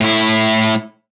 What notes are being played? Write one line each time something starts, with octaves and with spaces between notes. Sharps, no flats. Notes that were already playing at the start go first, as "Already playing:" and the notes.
A2 E4